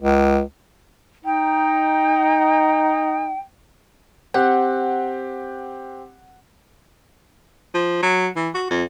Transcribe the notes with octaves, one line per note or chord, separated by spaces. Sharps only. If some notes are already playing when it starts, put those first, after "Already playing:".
C#2
D#4 G5
C4 G4 F#5
F3
F#3
E3
F#4
F2